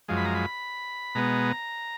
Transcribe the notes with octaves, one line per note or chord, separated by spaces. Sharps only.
F#2 F3 G#3
B5
A#5
B5
B2 G#3 B3 A#5